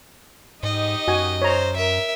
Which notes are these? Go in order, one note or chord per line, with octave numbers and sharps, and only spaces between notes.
G#2 D#4 G4 D#5
F#2 F#4 G#5
C5 C#5 A#5
A#4 E5